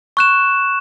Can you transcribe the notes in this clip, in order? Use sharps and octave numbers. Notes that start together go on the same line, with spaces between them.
C#6 F#6 E7